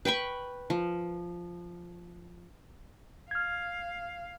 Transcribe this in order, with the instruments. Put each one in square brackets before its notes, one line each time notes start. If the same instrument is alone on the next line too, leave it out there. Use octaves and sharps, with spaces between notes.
[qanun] B4 G5 B5 C#6
F3
[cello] F5 [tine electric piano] F6 G#6